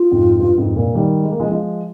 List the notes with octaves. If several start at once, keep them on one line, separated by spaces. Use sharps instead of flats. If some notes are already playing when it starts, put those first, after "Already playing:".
Already playing: F4
F2 G#2
G2
F2 G#2
G2 A#2
D#3 G3
G#3
A#3
F3 G#3
F3 G#3